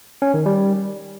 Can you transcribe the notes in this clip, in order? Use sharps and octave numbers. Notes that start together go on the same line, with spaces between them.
C#4
D#3
G3